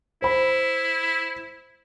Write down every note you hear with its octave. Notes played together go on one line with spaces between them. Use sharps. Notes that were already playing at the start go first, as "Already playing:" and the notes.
E4 C5 B5